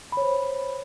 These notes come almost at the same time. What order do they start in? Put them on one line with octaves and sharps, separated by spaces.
B5 C#5 C5